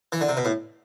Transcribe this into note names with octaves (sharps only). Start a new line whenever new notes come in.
E3
D3
C3
B2
A2